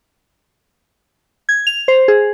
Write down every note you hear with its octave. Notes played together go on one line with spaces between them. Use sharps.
G#6
F7
C5
G#4